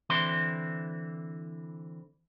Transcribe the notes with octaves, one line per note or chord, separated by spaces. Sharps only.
D3 E3 C4 E4 C6